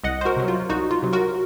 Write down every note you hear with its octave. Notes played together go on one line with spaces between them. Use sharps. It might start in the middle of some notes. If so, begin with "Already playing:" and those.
C2 D#5 F#5
C5
F#4 A#4
C3 F#3
F4
C2 D#4 F#4
F4
C3 F#3
F#4 A#4